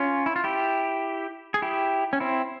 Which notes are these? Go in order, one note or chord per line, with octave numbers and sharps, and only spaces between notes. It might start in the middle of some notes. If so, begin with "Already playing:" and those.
Already playing: C#4 F4
E4
F4
E4 G4
G#4
E4 G4
C#4
C4 E4